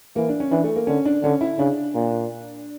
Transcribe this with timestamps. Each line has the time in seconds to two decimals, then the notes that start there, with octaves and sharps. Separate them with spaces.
0.16 E3 A#3
0.29 D4
0.40 C#4
0.51 E3 D4
0.64 A3
0.76 A#3
0.87 D3 C#4
1.05 D4
1.23 D3 C#4
1.41 E4
1.59 C#3 D4
1.95 A#2